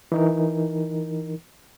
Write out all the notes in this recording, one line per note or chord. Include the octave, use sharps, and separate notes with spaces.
E3 D#4 A#4